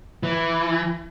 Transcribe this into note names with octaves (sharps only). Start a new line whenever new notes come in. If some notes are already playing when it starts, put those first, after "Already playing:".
E3